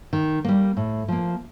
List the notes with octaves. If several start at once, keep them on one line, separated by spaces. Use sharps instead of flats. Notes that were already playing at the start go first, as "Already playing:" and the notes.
D#3
G3 A#3
A2
F3 A#3